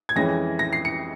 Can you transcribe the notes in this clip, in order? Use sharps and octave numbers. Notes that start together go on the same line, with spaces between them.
G#6
F2 E3 G#3 C#4 A#6
A#6
C7
C#7